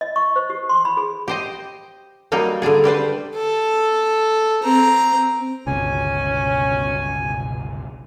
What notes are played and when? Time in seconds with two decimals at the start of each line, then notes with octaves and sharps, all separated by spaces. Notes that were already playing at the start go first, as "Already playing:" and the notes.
0.01 D#5
0.16 C#6
0.36 C5
0.50 G4
0.69 C6
0.85 B5
0.97 G#4
1.28 G4 C5 D#5
2.32 F#3 G3 A#3 D#4
2.62 D3 G3 D4 G#4
2.84 G3 G4 B4 C5
3.36 A4
4.63 C4 A#5
5.67 G1 C#2 B2 C#4 G#5